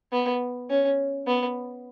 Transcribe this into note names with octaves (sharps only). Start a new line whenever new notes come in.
B3
C#4
B3